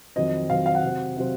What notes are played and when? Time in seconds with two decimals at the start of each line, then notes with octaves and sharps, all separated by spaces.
0.16 F2 D#3 F#3 C4 D#5
0.50 F2 D#3 F#3 C4 F5
0.66 F5
0.75 F#5
0.83 C3 F#3 C4
1.17 C3 F#3 C4